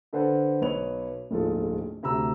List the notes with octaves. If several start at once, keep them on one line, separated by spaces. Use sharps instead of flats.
D3 A4 B4 C5 F#5
B1 B4 C#5 F7
D1 A#1 G#2 F4 A4
D2 C3 A#5 E6